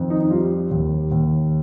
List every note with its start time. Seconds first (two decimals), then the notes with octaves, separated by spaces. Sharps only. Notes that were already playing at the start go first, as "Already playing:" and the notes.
Already playing: F2 D#3
0.10 D#4
0.30 G3 F4
0.71 D#2
1.12 D#2